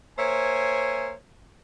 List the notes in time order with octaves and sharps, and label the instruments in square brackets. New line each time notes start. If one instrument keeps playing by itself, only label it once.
[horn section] A#3 C5 C#5 E5 G#5